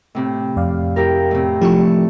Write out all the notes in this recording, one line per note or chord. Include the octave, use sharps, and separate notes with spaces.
A2 C3
F2 D5 F5
E4 G4 A#4
A2 C3
F3 A3 D4 E4 G4 C#6